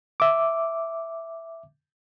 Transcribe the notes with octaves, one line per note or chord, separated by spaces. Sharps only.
E5 D6